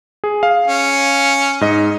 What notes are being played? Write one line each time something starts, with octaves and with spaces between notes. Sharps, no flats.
G#4
F5
C#4
G#2 D#5